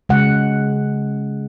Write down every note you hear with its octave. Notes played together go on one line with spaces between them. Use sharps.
C#3 G#3 F#5